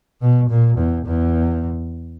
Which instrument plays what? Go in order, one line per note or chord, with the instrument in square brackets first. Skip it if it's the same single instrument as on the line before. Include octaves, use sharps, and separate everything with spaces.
[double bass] B2
A#2
E2
E2